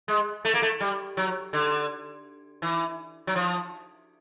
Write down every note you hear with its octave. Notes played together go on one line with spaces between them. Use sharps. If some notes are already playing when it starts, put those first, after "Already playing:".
G#3
A3
A#3
A3
G3
F#3
D3
E3
F#3
F3